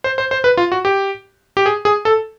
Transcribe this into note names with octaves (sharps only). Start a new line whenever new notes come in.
C5
C5
C5
B4
F4
F#4
G4
G4
G#4
G#4
A4